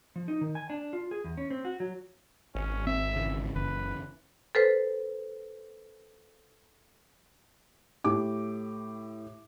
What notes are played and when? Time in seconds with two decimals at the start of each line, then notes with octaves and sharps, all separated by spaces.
0.16 F3
0.28 D#4
0.41 D#3
0.55 G#5
0.70 D4
0.93 F4
1.11 G#4
1.24 E2
1.37 C#4
1.50 C4
1.65 F#4
1.80 F#3
2.55 G#1 C#4
2.87 C4 E5
3.16 C#3 E3
3.56 F#1 B4
4.55 A4 B4 C5
8.04 A2 G4 D6